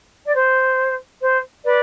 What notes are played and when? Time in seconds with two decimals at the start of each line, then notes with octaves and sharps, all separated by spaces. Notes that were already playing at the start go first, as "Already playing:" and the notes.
0.24 D5
0.33 C5
1.21 C5
1.64 B4 D5